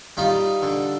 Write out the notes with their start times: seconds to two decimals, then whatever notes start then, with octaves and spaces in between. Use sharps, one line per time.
0.17 G3 D#4 F4
0.62 D3